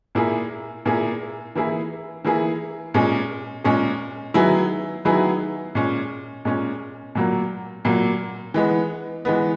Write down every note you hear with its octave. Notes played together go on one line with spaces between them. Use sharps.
A#2 A#3 E4 G#4
A#2 A#3 E4 G#4
E3 A#3 E4 G#4
E3 A#3 E4 G#4
A#2 G#3 C#4 G#4
A#2 G#3 C#4 G#4
D#3 F#3 B3 E4 G#4
D#3 F#3 B3 E4 G#4
A#2 G#3 C#4
A#2 G#3 C#4
A#2 F#3 A#3
A#2 F#3 A#3
E3 G#3 B3
E3 G#3 B3